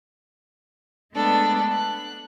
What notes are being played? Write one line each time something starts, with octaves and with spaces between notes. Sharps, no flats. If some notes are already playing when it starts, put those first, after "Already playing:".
G#3 A3 B3 D4 A4 D5
F#6